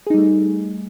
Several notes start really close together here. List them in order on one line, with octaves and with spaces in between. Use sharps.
G#4 D#4 G3 A3